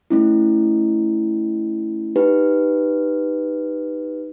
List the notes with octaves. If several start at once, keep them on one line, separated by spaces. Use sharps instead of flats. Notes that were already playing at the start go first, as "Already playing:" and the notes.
A3 C#4 E4
D#4 G4 B4